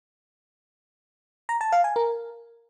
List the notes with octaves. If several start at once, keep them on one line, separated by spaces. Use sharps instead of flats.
A#5
A5
F5
G#5
A#4